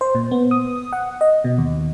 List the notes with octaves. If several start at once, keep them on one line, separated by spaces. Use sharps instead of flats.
C5
A#2
B3
D#6
F#5
D#5
B2
D#2